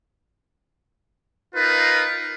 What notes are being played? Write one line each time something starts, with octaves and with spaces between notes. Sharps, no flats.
D#4 F4 A#4 B4